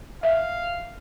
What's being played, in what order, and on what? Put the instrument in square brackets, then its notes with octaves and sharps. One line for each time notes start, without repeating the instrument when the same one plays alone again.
[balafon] E5 [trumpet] F5